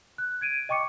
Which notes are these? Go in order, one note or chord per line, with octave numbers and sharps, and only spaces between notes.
F#6
G#6 D7 D#7
D#5 G5 C#6 D6 C#7